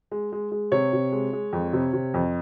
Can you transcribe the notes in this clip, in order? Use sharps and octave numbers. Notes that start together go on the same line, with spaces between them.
G#3
G#3
G#3
C3 C#5
C3
G#3
G#3
F2
C3
C3
F2